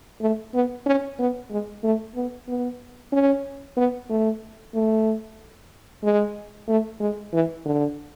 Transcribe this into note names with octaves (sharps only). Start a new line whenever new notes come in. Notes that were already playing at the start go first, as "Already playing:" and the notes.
A3
B3
C#4
B3
G#3
A3
B3
B3
C#4
B3
A3
A3
G#3
A3
G#3
E3
D3